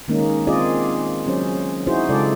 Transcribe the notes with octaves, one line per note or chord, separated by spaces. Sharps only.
D#3 G#3 A#3 C#4 D#4
C4 F4 G#4 D5 D#5
F#3 C#4 G#4 C5
D#4 E4 F#4 G#4 C5
C#3 G#3 F4 A4 D5